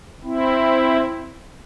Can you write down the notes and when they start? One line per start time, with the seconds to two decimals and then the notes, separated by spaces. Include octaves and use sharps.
0.23 C4 E4